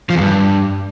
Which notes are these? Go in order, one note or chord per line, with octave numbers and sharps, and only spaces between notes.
F3
E2
G2